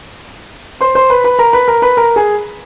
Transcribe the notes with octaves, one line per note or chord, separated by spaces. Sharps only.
C5 C6
C5 C6
B4 B5
B4 B5
A#4 A#5
B4 B5
A#4 A#5
B4 B5
A#4 A#5
G#4 G#5